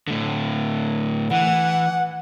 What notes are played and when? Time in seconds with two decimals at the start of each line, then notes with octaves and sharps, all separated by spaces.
0.08 A2 D3
1.31 E3 F#5